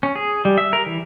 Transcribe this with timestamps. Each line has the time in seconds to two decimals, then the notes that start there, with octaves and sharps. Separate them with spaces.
0.03 C#4
0.16 G#4
0.45 G3
0.58 E5
0.73 A#4
0.86 E3